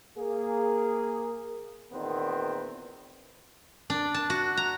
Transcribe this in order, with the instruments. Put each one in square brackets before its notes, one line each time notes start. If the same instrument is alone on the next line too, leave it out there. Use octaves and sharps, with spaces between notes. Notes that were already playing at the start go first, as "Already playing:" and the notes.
[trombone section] A#3 G#4
E2 A#2 D#3 B3 C4 B4
[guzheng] D4
A5
F#4
A#5